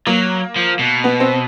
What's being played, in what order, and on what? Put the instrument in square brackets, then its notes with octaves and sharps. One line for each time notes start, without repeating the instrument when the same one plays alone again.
[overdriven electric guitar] F#3 [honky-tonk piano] A#3
[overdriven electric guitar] F3
B2
[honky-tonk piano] B3
C4